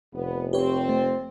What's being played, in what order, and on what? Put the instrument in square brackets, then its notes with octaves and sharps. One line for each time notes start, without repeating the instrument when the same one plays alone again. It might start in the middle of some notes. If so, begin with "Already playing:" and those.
[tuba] F1 [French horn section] B3
[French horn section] C4 [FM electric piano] G4 B4 C#5
[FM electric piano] A3